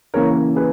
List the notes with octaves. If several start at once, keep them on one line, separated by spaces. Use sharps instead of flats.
C#3 E3 A#3 C#4 A#4 C#5
G#4 B4